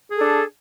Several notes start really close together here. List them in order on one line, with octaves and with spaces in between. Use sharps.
G#4 A4 D4